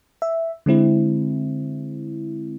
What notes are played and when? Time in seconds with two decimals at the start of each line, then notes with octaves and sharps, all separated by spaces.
0.22 E5
0.66 D3 G#3 C4 E4